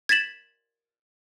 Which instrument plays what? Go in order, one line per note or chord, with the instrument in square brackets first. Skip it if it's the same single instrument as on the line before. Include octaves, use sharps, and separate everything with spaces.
[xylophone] G#6 A6 B6 E7 F#7